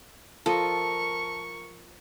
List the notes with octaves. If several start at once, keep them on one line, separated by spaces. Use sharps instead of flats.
F3 A4 A#4 D#5 C6 C#6